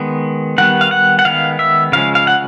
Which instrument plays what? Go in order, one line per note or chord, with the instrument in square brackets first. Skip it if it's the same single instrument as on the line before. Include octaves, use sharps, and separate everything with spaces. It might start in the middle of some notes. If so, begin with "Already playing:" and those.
Already playing: [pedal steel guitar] D#3 G#3 B3
D#3 G3 B3 F#5
F5
F#5
F#5
D#3 G#3 B3 F5
E5
C#3 F3 G#3 F5
F5
F#5